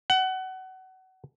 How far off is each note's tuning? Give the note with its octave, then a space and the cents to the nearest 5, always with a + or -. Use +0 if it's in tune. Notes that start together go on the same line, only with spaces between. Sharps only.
F#5 +25